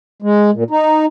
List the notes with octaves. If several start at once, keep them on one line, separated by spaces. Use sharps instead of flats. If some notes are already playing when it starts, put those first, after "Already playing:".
G#3
A#2
D#4